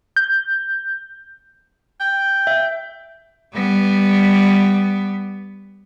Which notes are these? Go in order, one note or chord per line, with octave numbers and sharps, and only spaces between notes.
G6
G5
E5
G3 B3